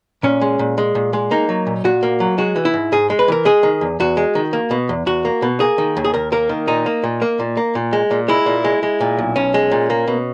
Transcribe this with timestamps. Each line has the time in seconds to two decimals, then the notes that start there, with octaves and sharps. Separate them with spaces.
0.23 A#2 C#4
0.41 G#3
0.59 A#2
0.78 G#3
0.95 A#2
1.13 G#3
1.31 A#3 D#4
1.49 F#3
1.67 A#2
1.84 A#2 F#4
2.03 A#3
2.20 F#3
2.38 G#3 F#4
2.56 E3
2.65 E4
2.74 G#2
2.92 G#2 G#4
3.10 G#3
3.19 B4
3.28 E3 A#4
3.45 G#3 G#4
3.63 D#3
3.81 E2
4.00 E2 F#4
4.17 G#3
4.35 D#3
4.53 A#3
4.71 B2
4.89 E2
5.06 E2 F#4
5.25 A#3
5.42 B2
5.60 A#3 G#4
5.78 D#3
5.97 D#2
6.05 G#4
6.14 D#2 A#4
6.32 A#3 A#4
6.49 D#3
6.67 A#2 D#4
6.86 A#3
7.04 A#2
7.22 A#3
7.40 A#2
7.57 A#3
7.75 A#2
7.93 G#3
8.11 A#2
8.28 G#3 E4
8.46 A#2
8.64 G#3
8.83 G#3
9.01 A#2
9.19 B1
9.36 B1 C#4
9.54 G#3
9.71 A#2
9.90 A#3
10.08 B2